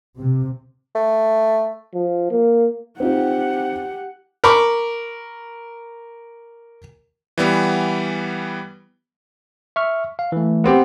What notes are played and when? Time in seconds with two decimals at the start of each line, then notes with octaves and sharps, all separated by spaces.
0.19 C3
0.95 A3
1.94 F3
2.31 A#3
3.00 C4 D#4 F4 G4 F#5
4.44 A#4 B5 C#6 D6
7.38 E3 G3 B3
9.76 E5 C#6 F6
10.19 F5
10.32 E3 A3
10.64 B3 C4 G4